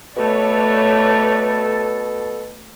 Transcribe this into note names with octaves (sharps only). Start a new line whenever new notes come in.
B2 A3 A4 B4 C#5 D5